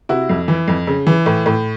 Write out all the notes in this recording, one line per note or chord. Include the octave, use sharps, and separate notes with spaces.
C3 E4 F#4
F2
E3
F2
C#3
E3
A2
A2